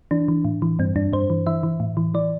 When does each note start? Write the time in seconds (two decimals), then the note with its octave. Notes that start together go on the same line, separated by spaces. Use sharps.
0.11 E3 D4
0.28 E3
0.45 A2
0.62 E3
0.79 G2 C4
0.96 G2 D4
1.13 G2 C5
1.30 E3
1.47 E3 E5
1.63 E3
1.80 A2
1.97 E3
2.14 E3 D5